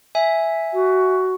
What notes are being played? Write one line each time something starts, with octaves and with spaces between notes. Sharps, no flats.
E5 G#5
F#4